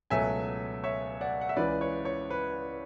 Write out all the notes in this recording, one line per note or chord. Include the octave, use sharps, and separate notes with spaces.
C#2 B2 F#3 A3 E5 G#5
C#5 E5
D5 F#5
F#5
E5
C#2 C#3 E3 B4 D5
C#5
C#5
B4